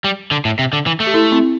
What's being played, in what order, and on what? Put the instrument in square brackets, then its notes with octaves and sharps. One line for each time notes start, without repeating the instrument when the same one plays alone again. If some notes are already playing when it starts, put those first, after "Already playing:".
[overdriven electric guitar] G3
D3
A2
C3
D3
E3
A3
[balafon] G4
E4 A4
C4 E4